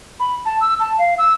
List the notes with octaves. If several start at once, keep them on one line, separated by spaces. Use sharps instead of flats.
B5
A5
E6
A5
F5
E6